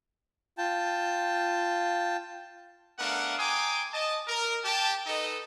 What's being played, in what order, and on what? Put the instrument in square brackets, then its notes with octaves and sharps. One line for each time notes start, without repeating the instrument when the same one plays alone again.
[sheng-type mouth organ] F4 G5 A5
[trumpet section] A3 B3 D4 A#4 F5 F#5
G5 G#5 A#5 C6 D6 D#6
D#5 A5
A#4
G4 G5 A5
D#4 A4 B4 D#5